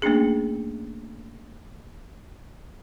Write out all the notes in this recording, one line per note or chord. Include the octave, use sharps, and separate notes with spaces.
A3 A#3 C#4 D4 G#4